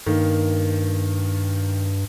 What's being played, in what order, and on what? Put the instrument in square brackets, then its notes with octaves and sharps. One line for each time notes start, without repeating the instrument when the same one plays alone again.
[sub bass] G2 [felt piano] D#3 A#3